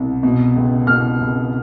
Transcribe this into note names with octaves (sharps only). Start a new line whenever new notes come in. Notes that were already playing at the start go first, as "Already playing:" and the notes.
Already playing: C2 B2
B2
C#2
B2 F6
C#2